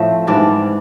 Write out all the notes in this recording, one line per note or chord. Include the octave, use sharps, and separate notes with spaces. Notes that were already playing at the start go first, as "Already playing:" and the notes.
Already playing: A2 F3 A3 C4
G#2 E3 G3 D4 D5